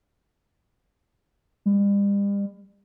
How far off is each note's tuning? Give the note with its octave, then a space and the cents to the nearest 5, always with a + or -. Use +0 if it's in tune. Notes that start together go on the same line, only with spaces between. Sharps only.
G3 +40